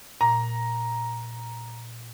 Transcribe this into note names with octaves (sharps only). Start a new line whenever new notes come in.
A#2 A#5